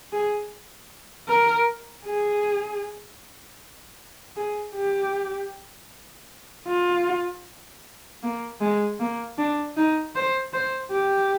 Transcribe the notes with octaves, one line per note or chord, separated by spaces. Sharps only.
G#4
A#4
G#4
G#4
G4
F4
A#3
G#3
A#3
D4
D#4
C5
C5
G4